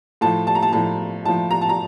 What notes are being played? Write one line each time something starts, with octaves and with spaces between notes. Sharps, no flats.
A2 F3 A5
A5
A#5
A5
A2 F3 A5
A2 F3 A5
A#5
A5
A#5